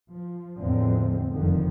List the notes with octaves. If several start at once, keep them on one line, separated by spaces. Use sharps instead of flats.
F3
E2 A2 D3 F3 G#3 C4
F1 C2 F2 D3 D#3 F3